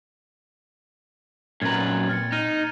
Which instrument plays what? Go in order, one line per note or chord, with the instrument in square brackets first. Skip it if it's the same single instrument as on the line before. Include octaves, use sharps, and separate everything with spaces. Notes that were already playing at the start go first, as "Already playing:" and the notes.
[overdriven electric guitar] F#2 B4 [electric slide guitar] A#2 C4 A#5 [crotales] G#6 A6
[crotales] F6 A6 C#7
[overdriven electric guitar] D#4 [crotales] F6 D#7